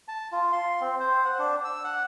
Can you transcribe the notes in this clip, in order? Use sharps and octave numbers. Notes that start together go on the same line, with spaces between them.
A5
F4
C6
C4
C5
F#5
D4
E6
F#5